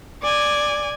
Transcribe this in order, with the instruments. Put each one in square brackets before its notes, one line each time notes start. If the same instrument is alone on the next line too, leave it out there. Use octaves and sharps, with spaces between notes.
[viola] D5 G#5